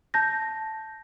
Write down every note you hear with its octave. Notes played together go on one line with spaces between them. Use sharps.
A5 G6 A#6